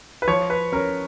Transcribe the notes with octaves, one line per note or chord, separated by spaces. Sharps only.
B4
F3 C#5
B4
C#4 A#4